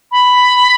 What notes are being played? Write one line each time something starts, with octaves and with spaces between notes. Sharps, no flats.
B5